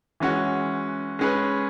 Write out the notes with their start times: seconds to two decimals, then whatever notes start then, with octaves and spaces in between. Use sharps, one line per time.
0.20 E3 G#3 C#4 F#4
1.19 G#3 C#4 G#4 B4